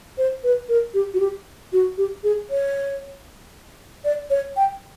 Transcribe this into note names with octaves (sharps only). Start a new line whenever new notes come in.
C5
B4
A#4
G4
F#4
G4
F#4
G4
G#4
C#5
D5
C#5
G5